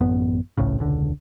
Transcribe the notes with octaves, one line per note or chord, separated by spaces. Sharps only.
A1 F#2 B3
G#1 C#2 A2 C#3
E1 C#2 D3